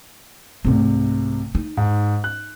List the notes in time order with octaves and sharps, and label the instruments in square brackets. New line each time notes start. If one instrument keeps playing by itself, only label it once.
[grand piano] C2 C3 [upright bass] G#2 A3
[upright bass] D#4
[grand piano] G#2
F#6